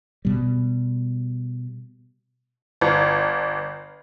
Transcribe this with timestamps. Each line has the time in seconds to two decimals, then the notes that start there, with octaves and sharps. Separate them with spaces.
0.25 B2 G3
2.81 G1